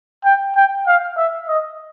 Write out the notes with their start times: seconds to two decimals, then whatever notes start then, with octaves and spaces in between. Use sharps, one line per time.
0.24 G5
0.56 G5
0.87 F5
1.17 E5
1.48 D#5